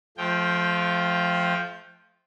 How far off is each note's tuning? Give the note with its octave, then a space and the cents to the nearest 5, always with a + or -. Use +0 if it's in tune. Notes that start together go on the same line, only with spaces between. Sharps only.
F3 +0 A3 -35 G5 +0